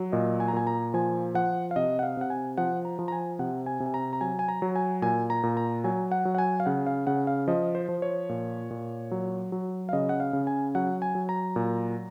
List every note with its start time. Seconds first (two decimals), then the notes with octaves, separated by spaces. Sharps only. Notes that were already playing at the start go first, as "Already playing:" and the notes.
Already playing: F#3
0.12 A#2 D#5
0.40 G#5
0.48 A#5
0.53 A#2 G#5
0.67 A#5
0.94 F3 G#5
1.34 F3 F#5
1.71 F5
1.76 C3 D#5
1.99 F#5
2.03 F5
2.17 C3 F#5
2.30 G#5
2.58 F3 F#5
2.85 A#5
2.99 F3
3.08 A#5
3.12 G#5
3.39 C3 F#5
3.66 G#5
3.80 C3
3.86 G#5
3.94 A#5
4.13 A#5
4.21 F#3 G#5
4.39 G#5
4.48 A#5
4.62 F#3
4.76 G#5
5.02 A#2 G#5
5.30 A#5
5.43 A#2
5.57 A#5
5.84 F#3 G#5
6.12 F#5
6.25 F#3
6.35 F#5
6.38 G#5
6.60 F5
6.66 C#3 F#5
6.87 F5
7.07 C#3 F#5
7.27 F5
7.48 F3 D#5
7.75 C5
7.89 F3
8.02 C#5
8.29 A#2
8.70 A#2
9.11 F#3
9.52 F#3
9.89 F5
9.93 C#3 D#5
10.09 F#5
10.20 F5
10.33 C#3
10.47 G#5
10.75 F#3 F#5
11.02 G#5
11.15 F#3
11.29 A#5
11.56 A#2